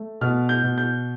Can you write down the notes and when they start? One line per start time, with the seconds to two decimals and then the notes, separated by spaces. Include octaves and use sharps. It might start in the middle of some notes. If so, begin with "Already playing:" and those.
Already playing: A3
0.21 B2 F6
0.49 G6
0.63 B2
0.78 G6